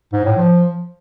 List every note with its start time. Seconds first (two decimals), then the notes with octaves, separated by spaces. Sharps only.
0.13 G#2
0.25 A2
0.37 F3